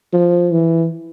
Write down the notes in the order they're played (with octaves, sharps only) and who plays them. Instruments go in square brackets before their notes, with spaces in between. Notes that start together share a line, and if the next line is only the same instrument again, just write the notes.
[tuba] F3
E3